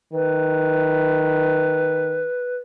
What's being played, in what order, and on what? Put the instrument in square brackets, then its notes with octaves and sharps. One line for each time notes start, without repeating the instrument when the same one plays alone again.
[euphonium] D#3 [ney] B4